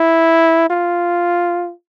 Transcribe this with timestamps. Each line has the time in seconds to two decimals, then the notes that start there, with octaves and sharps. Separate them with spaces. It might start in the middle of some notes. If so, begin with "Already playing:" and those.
Already playing: E4
0.70 F4